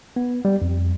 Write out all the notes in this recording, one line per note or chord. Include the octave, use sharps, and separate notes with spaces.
B3
G3
F2